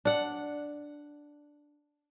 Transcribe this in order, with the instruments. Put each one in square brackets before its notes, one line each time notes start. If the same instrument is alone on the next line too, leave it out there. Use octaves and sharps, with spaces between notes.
[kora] D4 F#5